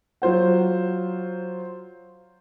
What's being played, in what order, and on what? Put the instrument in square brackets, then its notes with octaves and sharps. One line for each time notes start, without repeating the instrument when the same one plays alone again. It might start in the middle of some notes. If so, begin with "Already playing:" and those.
[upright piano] F#3 F4 C5 F#5